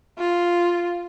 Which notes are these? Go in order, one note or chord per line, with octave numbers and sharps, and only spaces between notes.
F4